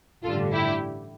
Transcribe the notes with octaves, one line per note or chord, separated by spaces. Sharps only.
A1 G2 D3 G3 F4 A4
E4 G4